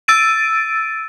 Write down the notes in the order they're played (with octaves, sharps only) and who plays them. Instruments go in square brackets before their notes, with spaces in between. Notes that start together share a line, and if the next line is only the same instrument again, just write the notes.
[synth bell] E6 A6 D7 D#7